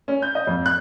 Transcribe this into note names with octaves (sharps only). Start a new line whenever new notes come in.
C#4
G6
D#5
F2
F#6